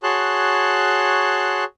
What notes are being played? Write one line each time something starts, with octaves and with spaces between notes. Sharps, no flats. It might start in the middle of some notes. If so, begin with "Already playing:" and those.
F#4 G#4 C#5 A5 C6 F#6